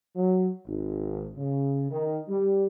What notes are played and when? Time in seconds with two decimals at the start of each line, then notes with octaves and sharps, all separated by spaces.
0.16 F#3
0.67 G#1
1.37 C#3
1.90 D#3
2.29 G3